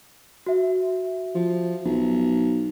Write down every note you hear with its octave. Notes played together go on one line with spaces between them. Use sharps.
F#4 E5
F3
B1